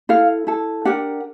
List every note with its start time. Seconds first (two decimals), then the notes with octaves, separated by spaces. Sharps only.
0.09 E4 A4 F5
0.47 E4 A4
0.85 D4 G4 A#4 F#5